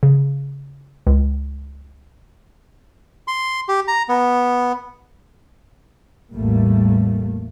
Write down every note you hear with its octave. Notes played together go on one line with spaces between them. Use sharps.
C#3
C#2
C6
G4
A#5
B3
A1 E2 G3 A3 A#3